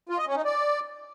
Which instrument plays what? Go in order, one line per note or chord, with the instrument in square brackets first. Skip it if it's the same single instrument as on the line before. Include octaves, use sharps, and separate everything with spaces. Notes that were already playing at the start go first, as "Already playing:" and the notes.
[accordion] F4
D#5
C#4
D#4
D5